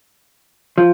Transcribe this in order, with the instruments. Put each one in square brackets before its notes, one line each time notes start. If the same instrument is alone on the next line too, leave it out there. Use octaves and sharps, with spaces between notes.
[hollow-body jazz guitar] F3